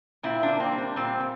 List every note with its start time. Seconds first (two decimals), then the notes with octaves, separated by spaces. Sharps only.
0.23 A#2 C4 E4
0.43 A#3 D4
0.60 C4
0.72 G3
0.78 D4
0.96 A#2 C4
1.20 A#2